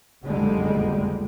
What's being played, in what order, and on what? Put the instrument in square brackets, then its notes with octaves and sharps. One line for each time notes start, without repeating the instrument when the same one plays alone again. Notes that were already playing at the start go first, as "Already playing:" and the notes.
[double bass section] F#1 B1 F2 D3 G3 G#3